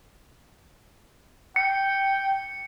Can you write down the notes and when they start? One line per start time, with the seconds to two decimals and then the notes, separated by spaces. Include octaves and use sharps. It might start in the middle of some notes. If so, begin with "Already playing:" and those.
1.56 G5 C#7